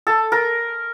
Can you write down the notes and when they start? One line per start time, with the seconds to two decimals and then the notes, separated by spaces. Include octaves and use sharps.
0.07 A4
0.32 A#4